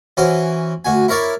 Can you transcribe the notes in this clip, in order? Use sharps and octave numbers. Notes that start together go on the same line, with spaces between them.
E3 C#4 F#4 C5
D2 F#4 G#5
E4 A#4 C#5 D5 E5